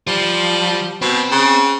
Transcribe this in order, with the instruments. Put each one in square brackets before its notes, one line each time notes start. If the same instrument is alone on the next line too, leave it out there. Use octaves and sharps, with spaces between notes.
[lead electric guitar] F3 [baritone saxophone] G3
[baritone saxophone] B2 [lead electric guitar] C4
[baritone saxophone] C#3